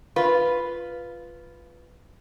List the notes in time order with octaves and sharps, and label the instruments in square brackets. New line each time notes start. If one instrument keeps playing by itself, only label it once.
[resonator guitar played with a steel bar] F4 B4